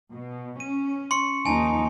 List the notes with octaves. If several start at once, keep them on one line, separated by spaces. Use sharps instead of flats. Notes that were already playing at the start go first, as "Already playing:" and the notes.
B2
C#4 D#7
C6 C#6 C#7
D#2 F3 D#4 G#5 A5